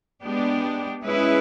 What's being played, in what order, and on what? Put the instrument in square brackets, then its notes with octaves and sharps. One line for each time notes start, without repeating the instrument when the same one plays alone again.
[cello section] G#3 B3 D4 G4
G#3 C#4 E4 G#4 B4